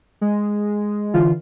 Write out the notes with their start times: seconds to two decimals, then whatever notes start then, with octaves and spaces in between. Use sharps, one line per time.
0.21 G#3
1.14 D3 E3 F4